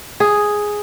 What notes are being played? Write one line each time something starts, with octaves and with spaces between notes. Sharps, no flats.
G#4